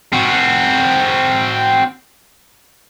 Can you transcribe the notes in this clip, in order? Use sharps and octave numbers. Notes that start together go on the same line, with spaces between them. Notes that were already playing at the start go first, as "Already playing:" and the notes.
C4 F#4